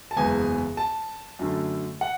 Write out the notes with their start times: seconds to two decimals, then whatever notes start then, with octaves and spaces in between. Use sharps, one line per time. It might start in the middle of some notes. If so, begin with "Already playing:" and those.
0.11 A5
0.17 F#1 E2 C#3 G#3 B3 G#5
0.77 A5
1.39 F#2 D3 A3
2.01 F#5